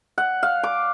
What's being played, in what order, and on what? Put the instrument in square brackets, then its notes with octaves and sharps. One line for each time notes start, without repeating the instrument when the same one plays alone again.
[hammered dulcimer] F#5
F5
D6